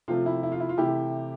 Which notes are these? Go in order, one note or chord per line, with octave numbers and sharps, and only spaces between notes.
C3 F3 A3 C4 F4
E4
E4
F4
E4
F4
C3 E3 A3 E4 G4